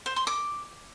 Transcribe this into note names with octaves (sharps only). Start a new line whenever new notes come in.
C5
C6
D6